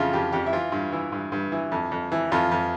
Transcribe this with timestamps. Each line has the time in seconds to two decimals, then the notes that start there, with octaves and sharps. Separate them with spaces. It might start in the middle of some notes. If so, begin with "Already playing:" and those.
Already playing: F2 C#3 E4 F4
0.13 F2 G4
0.32 F2 G4
0.46 E4
0.53 E3 F4
0.72 G2
0.92 E3 E4
1.12 G2
1.32 G2
1.52 E3
1.72 F2
1.92 F2
2.12 E3
2.32 F2 F4
2.51 F2